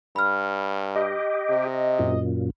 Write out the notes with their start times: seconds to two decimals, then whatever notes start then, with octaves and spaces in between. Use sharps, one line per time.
0.16 G2 B5 F6
0.96 G4 D#5
1.50 C3
1.99 F#2 A#2